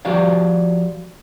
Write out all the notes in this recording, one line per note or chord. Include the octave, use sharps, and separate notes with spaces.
F3 F#4 G4 D5 F5